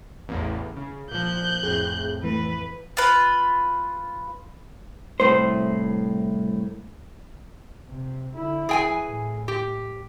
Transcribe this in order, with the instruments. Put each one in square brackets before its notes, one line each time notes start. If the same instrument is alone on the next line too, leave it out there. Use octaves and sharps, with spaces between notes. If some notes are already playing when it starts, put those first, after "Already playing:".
[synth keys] A1 E2
C#3
[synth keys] A#2 F3 [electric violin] F#6 G6
[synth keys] F2 A2 [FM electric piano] G#4
[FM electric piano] E3 A3 [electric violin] B4
[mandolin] F4 B4
[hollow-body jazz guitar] C2 A2 C5
[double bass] C3
D3 E4
[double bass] E3 [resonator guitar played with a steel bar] G#4 G5 G#5
[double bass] A2
[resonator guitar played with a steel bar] G4